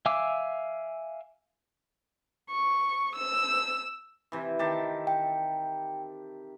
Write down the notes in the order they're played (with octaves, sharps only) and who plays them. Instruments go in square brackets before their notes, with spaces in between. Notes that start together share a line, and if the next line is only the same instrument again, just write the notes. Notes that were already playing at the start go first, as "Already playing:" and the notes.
[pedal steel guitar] E5 F5 G#5 D6 E6
[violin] C#6
E6
[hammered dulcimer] C3 E3
D#3 G4 A5
[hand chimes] G5